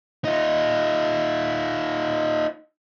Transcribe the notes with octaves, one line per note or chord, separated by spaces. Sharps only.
D#4 F4